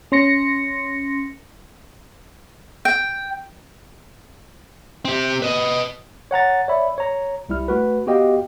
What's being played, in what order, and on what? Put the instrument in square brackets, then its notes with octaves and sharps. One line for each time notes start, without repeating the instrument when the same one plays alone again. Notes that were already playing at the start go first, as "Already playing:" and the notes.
[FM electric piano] C#4 C6 A#6 C#7
[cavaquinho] G5
[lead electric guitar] C4 G4
B4 D#5
[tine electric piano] C#5 F#5 A#5 A6
C#5 D5 E5 B5
C#5 A#5
C2 G3 E4 F6
A3 F#4 B4
B3 F#4 G4 D#5 F5 G5